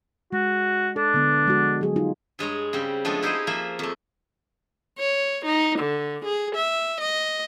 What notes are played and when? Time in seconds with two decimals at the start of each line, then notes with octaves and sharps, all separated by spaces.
0.32 G#3 F#4
0.96 D4 A4
1.14 D3 B3
1.45 F3 G#3 F#4
1.81 F#3 G#4
1.96 D#4 F4
2.39 G2 G#3 C#5 A#5
2.73 C#3 G3 C4
3.05 F3 G#3 A3 B3 D4
3.22 D#4 E4 G4 G#4 C5 D#5
3.47 F3 A#3 G#4 E5
3.79 F2 A3
4.99 C#5
5.45 D#4
5.79 D3
6.25 G#4
6.55 E5
7.01 D#5